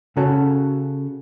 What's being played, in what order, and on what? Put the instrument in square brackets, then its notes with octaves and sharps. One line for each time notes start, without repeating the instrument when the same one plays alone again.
[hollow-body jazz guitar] C#3 C#4 F#4 A4 C#5 A5